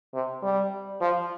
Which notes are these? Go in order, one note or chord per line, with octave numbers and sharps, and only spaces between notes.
C3
G3
F3